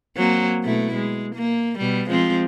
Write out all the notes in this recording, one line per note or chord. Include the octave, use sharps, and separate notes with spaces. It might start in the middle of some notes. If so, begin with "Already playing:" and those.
F#3 A#3 C4
B2 A3 E4
G#3
A#3
B2 G3
F3 G#3 C4